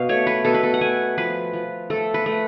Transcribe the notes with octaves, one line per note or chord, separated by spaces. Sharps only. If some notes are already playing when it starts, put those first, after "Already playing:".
Already playing: B2 F5
A3 C#5
B4
B2 A4
B4
A4
F#5
A3 G#5
F3 B4
F3
A3 A4
B4
A3